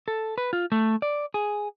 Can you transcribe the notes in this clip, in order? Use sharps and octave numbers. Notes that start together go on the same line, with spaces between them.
A4
B4
F4
A3
D5
G#4